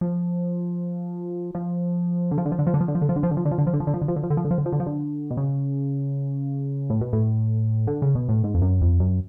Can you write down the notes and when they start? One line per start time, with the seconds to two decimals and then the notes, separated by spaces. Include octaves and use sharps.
0.01 F3
1.55 F3
2.31 D3
2.38 F3
2.46 D3
2.52 F3
2.59 D3
2.67 F3
2.74 D3
2.81 F3
2.88 D3
2.95 F3
3.01 D3
3.09 F3
3.16 D3
3.23 F3
3.31 D3
3.37 F3
3.45 D3
3.51 F3
3.58 D3
3.67 F3
3.74 D3
3.80 F3
3.87 D3
3.94 F3
4.02 D3
4.08 F3
4.16 D3
4.23 F3
4.30 D3
4.37 F3
4.45 D3
4.51 F3
4.58 D3
4.66 F3
4.73 D3
4.80 F3
4.87 D3
5.31 B2
5.37 C#3
6.90 A2
7.01 B2
7.13 A2
7.87 D3
8.02 C#3
8.15 B2
8.29 A2
8.44 G#2
8.54 F2
8.62 F#2
8.82 F2
9.00 F#2